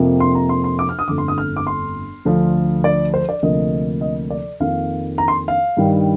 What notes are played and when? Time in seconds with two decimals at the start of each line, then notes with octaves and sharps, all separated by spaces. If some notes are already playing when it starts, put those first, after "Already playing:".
Already playing: F2 C3 F3 A#3
0.20 C6
0.35 A#5
0.49 C6
0.64 C6
0.79 D6
0.89 F6
0.99 D#6
1.08 G1 F2 D3 A3 D6
1.18 C6
1.28 D#6
1.38 F6
1.57 D6
1.67 C6
2.25 D2 D3 F3
2.84 D5
3.14 C5
3.29 D5
3.43 D2 C3 F3 A#3 D#5
4.01 D#5
4.30 D5
4.60 F2 D#3 A#3 F5
5.18 A#5
5.28 C6
5.48 F5
5.77 G2 D#3 G3